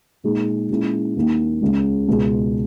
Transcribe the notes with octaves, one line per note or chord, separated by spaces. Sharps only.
A#2 G#3 D#4 G#4
A#2 G#3 C#4 E4
D#2 D#3 A#3
C#2 C#3 G#3 C#4
C#2 B2 G#3